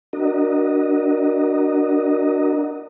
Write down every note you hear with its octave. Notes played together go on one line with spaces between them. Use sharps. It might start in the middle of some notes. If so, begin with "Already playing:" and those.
D4 F#4 A#4 D#5